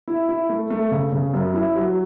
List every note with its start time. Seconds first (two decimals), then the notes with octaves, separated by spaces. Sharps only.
0.08 E4
0.29 E4
0.49 A3
0.70 A3
0.91 C#3
1.12 C#3
1.34 F#2
1.54 E4
1.75 F#3